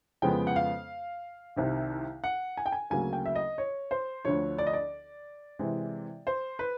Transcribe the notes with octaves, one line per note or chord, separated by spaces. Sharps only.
F2 C#3 F3 G#3 B3 G5
F#5
F5
C2 C3 D#3
F#5
G#5
G5
G#5
D2 C#3 F#3 A#3 G#5
G5
E5
D#5
C#5
C5
D2 D3 F3 C#5
D5
D#5
D5
C3 E3 G#3
C5
B4